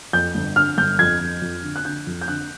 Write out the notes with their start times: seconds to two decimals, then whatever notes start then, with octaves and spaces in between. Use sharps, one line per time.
0.13 F2 G6
0.35 G1
0.56 D3 F6
0.78 G1 G6
0.99 F2 G#6
1.21 F2
1.42 F2
1.63 D3
1.76 F#6
1.85 D3 G6
2.07 F2
2.21 G6
2.28 D3 F#6